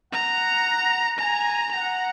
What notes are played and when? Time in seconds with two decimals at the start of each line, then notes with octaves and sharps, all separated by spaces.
0.12 F#5 A#5
1.18 G#5 A#5
1.72 F#5 A#5